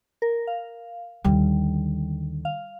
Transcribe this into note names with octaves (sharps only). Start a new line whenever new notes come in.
A#4
F5
D#2 D3 G3
F5